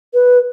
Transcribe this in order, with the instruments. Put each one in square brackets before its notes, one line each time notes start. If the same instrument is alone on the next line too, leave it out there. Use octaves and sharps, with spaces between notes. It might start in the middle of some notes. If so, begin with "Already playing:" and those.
[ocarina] B4